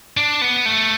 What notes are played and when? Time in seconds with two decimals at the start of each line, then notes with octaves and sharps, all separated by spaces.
0.17 D4
0.42 B3
0.66 A3